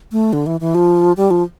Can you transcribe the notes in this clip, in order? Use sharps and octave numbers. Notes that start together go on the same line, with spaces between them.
A3
D3
E3
E3
F3
G3
F3